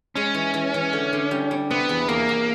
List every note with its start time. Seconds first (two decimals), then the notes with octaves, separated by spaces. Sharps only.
0.15 G#3 C#4
0.34 E3
0.54 E3
0.74 E3
0.93 D3
1.13 D3
1.31 G3
1.51 G3
1.70 C3 B3
1.89 E2
2.08 E2 A#3
2.29 E2